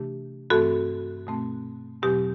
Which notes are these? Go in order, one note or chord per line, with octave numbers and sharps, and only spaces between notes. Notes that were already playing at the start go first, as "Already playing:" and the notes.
Already playing: C3 E3 A3 D4 G4
G2 E3 A3 C4 F#4 A4
B2 A3 C4
E2 B2 F#3 C4 G4